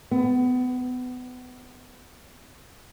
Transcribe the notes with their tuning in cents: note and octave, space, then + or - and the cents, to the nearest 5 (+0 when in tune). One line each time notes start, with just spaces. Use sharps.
B3 +25